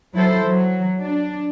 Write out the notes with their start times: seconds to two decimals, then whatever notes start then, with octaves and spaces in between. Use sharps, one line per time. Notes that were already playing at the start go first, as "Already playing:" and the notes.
0.14 F#3 E4 A4 C5
0.43 F#3
1.01 D4